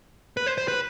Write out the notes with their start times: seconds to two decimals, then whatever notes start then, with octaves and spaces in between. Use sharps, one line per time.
0.37 B4
0.47 C5
0.58 C5
0.68 B4